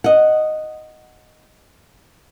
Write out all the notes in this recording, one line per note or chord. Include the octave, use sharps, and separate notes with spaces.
D#5 F#5